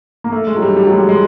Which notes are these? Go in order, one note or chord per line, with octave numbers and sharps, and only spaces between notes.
A#3
A3
G#3
F#3
G3
G3
F#3
G#3
G3
G#3